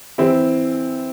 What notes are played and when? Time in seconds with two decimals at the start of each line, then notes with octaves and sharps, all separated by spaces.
0.18 E3 C4 E4